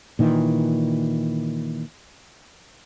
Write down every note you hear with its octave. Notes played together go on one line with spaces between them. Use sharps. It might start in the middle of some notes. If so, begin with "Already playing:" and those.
A#2 D#3 E3